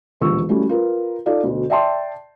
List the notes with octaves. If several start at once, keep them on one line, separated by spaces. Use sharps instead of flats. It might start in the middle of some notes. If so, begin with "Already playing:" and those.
E1 A#1 D#2 C#6 E6
G3 A3 C#4 E4 F#4
F4 A#4 B4
D#4 F4 A4 D5 F5
D2 B2
D5 E5 G5 A5 C6